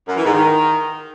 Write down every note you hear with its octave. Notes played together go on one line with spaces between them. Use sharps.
F#2
E3
G#2
D#3